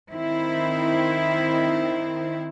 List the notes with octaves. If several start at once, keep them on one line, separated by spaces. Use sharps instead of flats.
D#3 C4 E4